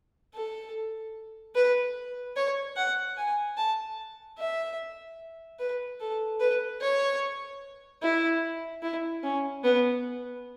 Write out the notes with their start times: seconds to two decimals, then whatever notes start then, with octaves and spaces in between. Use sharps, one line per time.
0.34 A4
1.55 B4
2.36 C#5
2.77 F#5
3.17 G#5
3.57 A5
4.39 E5
5.59 B4
6.00 A4
6.40 B4
6.81 C#5
8.02 E4
8.82 E4
9.23 C#4
9.64 B3